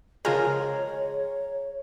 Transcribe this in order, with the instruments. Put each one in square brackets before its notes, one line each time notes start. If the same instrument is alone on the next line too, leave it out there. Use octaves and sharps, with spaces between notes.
[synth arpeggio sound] C#3 F4 A#5 [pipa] F3 G#3 A#4 [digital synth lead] G#4 [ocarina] C#5